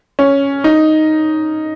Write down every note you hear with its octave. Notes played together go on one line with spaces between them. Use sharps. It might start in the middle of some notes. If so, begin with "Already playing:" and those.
C#4
D#4